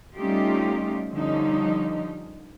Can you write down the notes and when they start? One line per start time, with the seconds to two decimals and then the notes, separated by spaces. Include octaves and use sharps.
0.17 G3 A3 C#4 D#4 F4 G4
1.11 D3 F3 G3 C#4 D#4